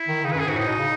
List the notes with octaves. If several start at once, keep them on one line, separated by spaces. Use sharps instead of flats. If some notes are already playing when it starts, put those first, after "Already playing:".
Already playing: E4
D#3
C#3 D#4
F#2 B4
G#4
G#2 F#4
A2 D#4
B2
C#3